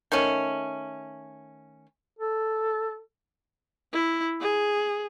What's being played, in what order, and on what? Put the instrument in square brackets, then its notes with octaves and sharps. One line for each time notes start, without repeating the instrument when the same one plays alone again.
[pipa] D#3 A3 C#4
[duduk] A4
[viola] E4
G#4